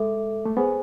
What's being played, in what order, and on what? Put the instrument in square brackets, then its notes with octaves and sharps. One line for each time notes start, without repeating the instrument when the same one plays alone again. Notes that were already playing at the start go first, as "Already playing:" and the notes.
Already playing: [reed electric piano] G#3 [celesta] A4 E5 D6
[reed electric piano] A3
[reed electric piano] B3 [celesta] G#4 C5 G#5